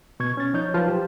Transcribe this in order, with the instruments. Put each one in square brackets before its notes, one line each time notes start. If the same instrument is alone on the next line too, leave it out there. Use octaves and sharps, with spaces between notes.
[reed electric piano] B2 C#6 G#6
C#4 A6
F3 D#4 C#5 G6
F3 F#3 F4 B4 C5 A5
G4